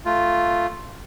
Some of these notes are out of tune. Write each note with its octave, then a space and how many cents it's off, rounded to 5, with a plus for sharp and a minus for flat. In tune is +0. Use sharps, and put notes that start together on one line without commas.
A3 +0 F4 +0